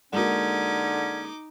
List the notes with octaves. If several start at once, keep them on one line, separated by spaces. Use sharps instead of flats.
D3 G#3 A#3 C#4 D#4 F#4 D6